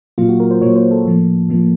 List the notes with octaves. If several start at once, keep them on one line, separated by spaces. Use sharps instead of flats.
A#2 F#3 A#3 F4
F#4
A#4
C5
A#2 F#3 A#3 C#5
C5
A4
A2 F3 A#3
A2 F3 A#3